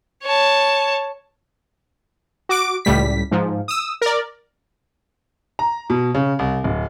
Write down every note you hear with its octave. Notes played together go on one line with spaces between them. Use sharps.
C#5 A5
F#4 D6 D7
C#2 A2 G3 B6
G#2 F3
D#6 E6
A#4 D5
A#5
B2
C#3
C2
D1